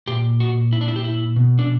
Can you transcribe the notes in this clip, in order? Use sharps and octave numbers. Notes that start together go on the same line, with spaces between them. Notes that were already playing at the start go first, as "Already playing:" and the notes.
A#2 G4
F#4
E4
D4
E4
G4
E4
B2
D4